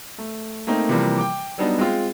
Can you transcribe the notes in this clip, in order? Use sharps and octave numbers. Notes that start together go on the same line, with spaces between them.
A3
A3 A#3 C4 D#4 A#4
C3 E3 F3 G3 A#3
G5 D6
F#3 G3 B3 D4 D#4
G#3 C4 F4